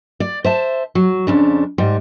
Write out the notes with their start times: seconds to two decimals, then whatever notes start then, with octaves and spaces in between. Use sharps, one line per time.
0.20 D5
0.44 C5 E5 A5
0.95 F#3
1.27 F2 C#3 D4
1.78 G#2 G3